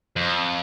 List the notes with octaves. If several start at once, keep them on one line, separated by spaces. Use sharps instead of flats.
F2